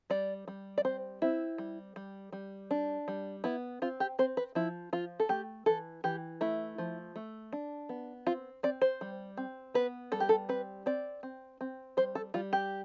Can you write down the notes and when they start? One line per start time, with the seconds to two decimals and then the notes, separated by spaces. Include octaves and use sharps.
0.10 G3 D5
0.48 G3
0.78 D5
0.85 C4 C5
1.22 C4 E4
1.58 G3
1.96 G3
2.32 G3
2.71 D4
3.08 G3
3.44 B3 E4
3.82 C4 F4
4.00 G4
4.19 C4 C5
4.37 B4
4.55 F3 E4
4.93 F3 F4
5.20 A4
5.29 A3 G4
5.66 E3 A4
6.04 E3 G4
6.41 A3 E4
6.78 F3
7.16 A3
7.53 D4
7.89 B3
8.26 C4 F4
8.63 C4 D5
8.82 C5
9.01 G3
9.37 C4
9.74 B3 B4
10.12 G3 A4
10.20 G4
10.29 A4
10.49 C4 B4
10.86 C4 D5
11.23 C4
11.61 C4
11.97 G3 C5
12.15 A4
12.34 G3 F4
12.53 G4